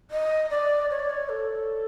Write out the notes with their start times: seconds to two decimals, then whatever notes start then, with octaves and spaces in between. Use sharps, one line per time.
0.11 D#5
0.50 D5
0.90 C#5
1.00 D5
1.09 C#5
1.29 A4